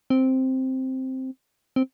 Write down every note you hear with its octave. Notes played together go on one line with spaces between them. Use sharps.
C4
C4